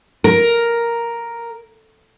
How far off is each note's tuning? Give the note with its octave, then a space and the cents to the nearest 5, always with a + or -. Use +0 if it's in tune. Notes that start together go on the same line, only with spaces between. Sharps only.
A#4 +5